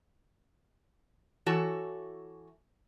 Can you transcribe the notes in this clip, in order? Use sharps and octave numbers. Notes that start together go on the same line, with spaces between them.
E3 F#4 A4 C#5 A5